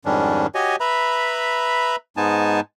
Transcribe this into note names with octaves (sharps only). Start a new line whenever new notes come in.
F2 G#2 D#3 G3 C#4 D4
F#4 G4 C#5 D#5 G#5
B4 E5 A#5 B5
G#2 G#3 B3 D#4 G#5 A5